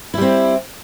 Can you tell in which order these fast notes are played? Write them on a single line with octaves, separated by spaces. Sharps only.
E4 G3 C4